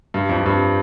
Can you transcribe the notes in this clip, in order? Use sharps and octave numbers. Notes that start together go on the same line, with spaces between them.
G2
F2
F2
G2